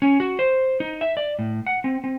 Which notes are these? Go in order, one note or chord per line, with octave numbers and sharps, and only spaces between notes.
C#4
F#4
C5
D#4
E5
D5
A2
F#5
C4
C4